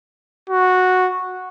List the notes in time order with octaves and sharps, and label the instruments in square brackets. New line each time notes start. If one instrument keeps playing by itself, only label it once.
[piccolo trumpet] F#4